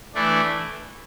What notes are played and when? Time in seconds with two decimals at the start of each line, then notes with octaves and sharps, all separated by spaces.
0.14 E3 A3 D4